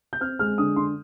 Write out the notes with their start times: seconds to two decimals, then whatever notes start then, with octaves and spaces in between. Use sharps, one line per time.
0.13 G6
0.20 C4 F6
0.39 G#3 F6
0.58 D3 D#6
0.76 D3 C6